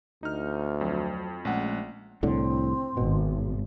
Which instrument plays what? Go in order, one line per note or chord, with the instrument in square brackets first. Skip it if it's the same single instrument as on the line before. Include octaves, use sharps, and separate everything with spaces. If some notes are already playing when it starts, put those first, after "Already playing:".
[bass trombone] D2 [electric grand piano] D#4 F6
[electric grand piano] F2 [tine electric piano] F#3
[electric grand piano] A#1 F#5 [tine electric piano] G#3 A3 C#4
[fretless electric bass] C2 A2 D3 [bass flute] C4
[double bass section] G#1 [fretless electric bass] B2